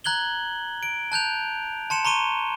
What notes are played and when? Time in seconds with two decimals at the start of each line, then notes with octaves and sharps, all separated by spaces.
0.04 A#5 F#6 G#6 F#7 G7
0.83 D7
1.12 A5 F#6 G6 F7
1.90 A5 C6 C#7 E7
2.05 A#5 C6 C#6 D#7 G7